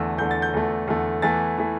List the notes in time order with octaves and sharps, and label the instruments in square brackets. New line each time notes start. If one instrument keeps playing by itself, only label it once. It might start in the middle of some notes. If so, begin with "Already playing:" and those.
Already playing: [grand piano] E2 D3 A3 E6
E2 D3 A3 G6
A6
G6
E2 D3 A3
E2 D3 A3
E2 E3 A3 A6
E3 A3